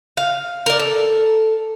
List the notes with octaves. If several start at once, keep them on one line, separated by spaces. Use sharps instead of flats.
F5
A#4 D5
A4